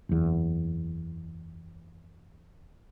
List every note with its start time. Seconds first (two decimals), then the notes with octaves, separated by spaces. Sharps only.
0.09 F#1 E2